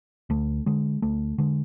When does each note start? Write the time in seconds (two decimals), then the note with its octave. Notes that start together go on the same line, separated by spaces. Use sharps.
0.30 D2 A3
0.66 D3 G#3
1.02 D2 A3
1.38 D3 G#3